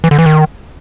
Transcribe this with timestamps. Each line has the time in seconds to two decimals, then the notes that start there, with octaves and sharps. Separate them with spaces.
0.04 E3
0.11 D3
0.19 E3
0.26 D#3